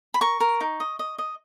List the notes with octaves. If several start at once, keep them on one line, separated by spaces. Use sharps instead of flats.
B5
A#4 C#6
A#4
D#4
D#5
D#5
D#5